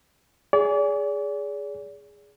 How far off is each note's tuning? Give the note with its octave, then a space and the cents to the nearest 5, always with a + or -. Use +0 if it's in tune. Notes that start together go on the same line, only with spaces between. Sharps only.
G#4 -5 D5 -40